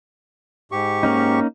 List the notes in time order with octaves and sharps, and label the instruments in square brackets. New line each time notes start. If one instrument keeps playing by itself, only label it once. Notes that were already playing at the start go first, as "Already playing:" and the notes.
[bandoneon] G#2 G4 C#6
[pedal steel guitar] A#3 C#4 D#4